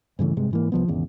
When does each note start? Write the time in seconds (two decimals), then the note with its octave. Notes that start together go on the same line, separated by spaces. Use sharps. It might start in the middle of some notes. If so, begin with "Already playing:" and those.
0.19 G2 C#3 E3 A3
0.37 G2 C3 G#3
0.51 G#2 E3 A#3
0.72 C2 F3 B3
0.88 G#1 E2 C#3